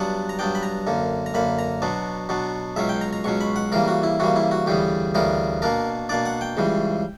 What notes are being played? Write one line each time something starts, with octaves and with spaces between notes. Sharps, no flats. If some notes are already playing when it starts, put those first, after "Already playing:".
Already playing: G2 F#3 B3 D4 F#5
A#5
G2 F#3 B3 D4 G5
B5
A#5
F#2 D3 A#3
A#5
F#2 D3 A#3 B5
A#5
B2 F#3 B3 D4
B2 F#3 B3 D4
C#2 B2 F#3 C#4 E5
G5
A#5
A#5
C#2 B2 F#3 C#4 C#6
B5
F#5
C#3 E3 G3 A#3 A#4
F#4
E4
C#3 E3 G3 A#3 F#4
E4
F#4
D2 C#3 E3 G3 B3 G4
D2 C#3 E3 G3 B3 A#4
B2 A#3 D4 A#4
B2 A#3 D4 D5
F#5
G5
C#2 C#3 E3 G3